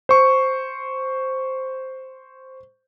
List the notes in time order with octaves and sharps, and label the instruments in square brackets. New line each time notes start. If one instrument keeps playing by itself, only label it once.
[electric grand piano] C5 C#6